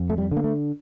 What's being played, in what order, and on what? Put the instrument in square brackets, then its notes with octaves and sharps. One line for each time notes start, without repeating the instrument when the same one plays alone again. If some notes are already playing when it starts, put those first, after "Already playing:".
Already playing: [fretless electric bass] F2
A3
G3
D3
A#3
A3